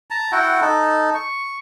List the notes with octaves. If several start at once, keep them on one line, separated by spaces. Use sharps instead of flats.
A5 A#5
E4 F#4 F#5 G5
D#4 A4
C#6